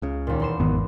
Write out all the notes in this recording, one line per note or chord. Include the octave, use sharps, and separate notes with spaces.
C#2 C#3
D#2 A#2
E2 C6 E7
G#1 F2 D#3 B3